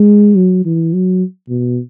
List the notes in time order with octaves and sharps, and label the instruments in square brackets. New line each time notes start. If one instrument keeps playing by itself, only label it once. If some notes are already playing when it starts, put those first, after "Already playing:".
Already playing: [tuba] G#3
F#3
E3
F#3
B2